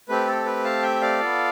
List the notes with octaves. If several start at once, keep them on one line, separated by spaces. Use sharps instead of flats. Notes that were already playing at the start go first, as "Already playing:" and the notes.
A3 C4 G4 B4
A4
B4
F5 A5
E5 G5
D5 F5
B3 F4 A4